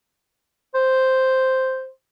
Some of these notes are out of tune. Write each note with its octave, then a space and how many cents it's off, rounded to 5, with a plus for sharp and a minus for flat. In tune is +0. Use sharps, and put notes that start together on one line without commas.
C5 +0